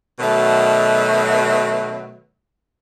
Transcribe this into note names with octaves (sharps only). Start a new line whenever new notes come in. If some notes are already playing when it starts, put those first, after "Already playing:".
B2 D#3 F#3 A3